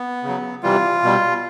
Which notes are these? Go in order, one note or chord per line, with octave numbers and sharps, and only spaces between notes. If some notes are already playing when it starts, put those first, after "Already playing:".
Already playing: B3
C#3 F#3
C3 E3 G3 F4
B2 G3